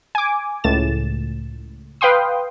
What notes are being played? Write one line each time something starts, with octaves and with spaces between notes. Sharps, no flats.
G#5 D6
C#2 A2 A6 E7
B4 F5 G5 C6 D#6